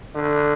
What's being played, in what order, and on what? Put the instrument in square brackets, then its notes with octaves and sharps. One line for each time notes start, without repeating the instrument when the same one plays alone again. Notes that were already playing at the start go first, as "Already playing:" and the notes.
[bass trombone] D3